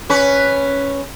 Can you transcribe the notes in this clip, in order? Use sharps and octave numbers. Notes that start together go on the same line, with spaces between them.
C#4 B4